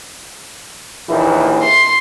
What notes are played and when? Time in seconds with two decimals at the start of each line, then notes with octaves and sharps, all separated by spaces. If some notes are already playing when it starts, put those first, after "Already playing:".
1.09 A#1 D#2 E3
1.63 C6